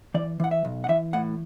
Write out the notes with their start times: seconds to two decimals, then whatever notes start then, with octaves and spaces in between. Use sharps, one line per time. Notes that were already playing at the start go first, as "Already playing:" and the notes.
0.14 E3 D5
0.40 E3 F#5
0.51 E5
0.65 B1
0.84 F#5
0.89 E3 E5
1.13 A2 F#5